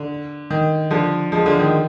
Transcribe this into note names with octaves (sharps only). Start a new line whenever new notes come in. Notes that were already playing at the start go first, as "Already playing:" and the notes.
Already playing: D3
D#3
D3 F3
F3 G#3
D3 F3
D#3